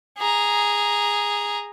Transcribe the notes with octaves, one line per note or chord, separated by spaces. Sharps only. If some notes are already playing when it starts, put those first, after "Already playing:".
G#4 A#5